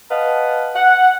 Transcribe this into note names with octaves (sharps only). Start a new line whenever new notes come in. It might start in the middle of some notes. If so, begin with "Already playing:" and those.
B4 D#5 F5 F#5 A5
F#5